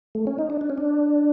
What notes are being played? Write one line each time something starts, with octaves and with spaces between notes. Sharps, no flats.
A3
C#4
D#4
D4
D4
C#4
D4